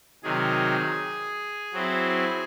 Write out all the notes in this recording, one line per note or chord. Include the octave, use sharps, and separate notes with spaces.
C3 D#3 F#3 G#4
F#3 C4 E4